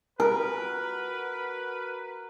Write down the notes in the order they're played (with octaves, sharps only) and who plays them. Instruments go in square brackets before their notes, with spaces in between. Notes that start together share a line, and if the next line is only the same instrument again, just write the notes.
[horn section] F#4 B4 [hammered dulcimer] A#4